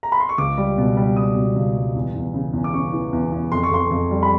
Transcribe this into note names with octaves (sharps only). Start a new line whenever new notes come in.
A#5
B5
C6
C#6
C#2 D6
G3
B2
G3
G3 D#6
B2
C#2
G3
E2
E2
C#3
E2
D6
C#3 C#6
E3
E2
E2
F2 C6
C#6
F2 C6
F2
G3
B5